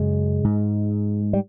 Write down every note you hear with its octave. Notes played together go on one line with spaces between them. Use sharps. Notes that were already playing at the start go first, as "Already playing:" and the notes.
Already playing: F#2 C#3 G#3
G#2
G3